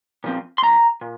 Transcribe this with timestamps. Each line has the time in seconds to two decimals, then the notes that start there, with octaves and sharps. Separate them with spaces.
0.24 A#2 F3 C4
0.58 C6
0.62 C2 A#5
1.01 A#2